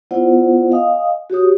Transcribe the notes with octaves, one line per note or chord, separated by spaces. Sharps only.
B3 E4 F4 C5 D5 F#5
D#5 F5 G#5 D#6
F#4 G4 C#5 D#6